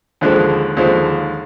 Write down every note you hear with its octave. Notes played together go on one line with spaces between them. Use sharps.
D#2 D3 F3 G#3
D#2 D3 F3 G#3